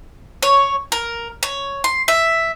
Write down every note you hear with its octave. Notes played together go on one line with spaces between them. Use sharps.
C#5
A#4
C#5
C6
E5